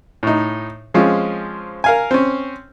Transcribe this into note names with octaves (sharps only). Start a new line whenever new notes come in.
A2 D#4
F3 G#3 C4 C#4 F4
A#4 F5 G#5
C4 C#4